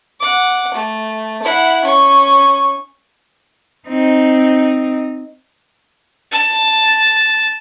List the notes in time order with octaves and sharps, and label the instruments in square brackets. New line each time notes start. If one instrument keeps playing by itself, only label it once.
[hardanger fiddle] F#5 D6
A3
E4 F#5
C#4 C#6
[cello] C4 D#4
[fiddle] A5